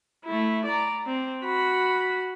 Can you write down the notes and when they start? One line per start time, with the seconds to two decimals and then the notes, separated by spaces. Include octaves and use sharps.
0.25 A3 E4
0.65 D5 A#5
1.06 C4
1.44 F#4 B5